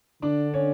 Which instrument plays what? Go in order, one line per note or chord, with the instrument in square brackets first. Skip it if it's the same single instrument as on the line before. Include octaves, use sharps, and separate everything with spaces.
[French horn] D3 [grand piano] D4 D5
[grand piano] C#4 C#5